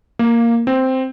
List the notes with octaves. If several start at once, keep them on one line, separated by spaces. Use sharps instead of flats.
A#3
C4